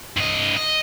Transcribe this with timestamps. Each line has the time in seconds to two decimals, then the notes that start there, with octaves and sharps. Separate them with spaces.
0.17 G2 D#5
0.56 D#5